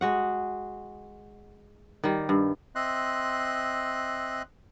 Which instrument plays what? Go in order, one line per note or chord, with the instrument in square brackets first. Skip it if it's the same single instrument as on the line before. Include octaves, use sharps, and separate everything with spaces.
[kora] G#3 F#4 F#5
D#3 G3
G2
[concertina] C4 D#5 E5 C6 F#6